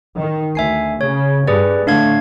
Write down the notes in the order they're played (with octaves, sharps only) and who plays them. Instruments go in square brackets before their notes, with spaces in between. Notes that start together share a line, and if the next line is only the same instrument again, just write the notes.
[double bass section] D#3
[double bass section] D2 [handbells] E5 G#5 C7
[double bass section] C#3 [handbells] C#5
[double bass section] G2 [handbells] G#4 B4 D5
[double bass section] A2 D3 A3 [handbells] D4 F5 G#6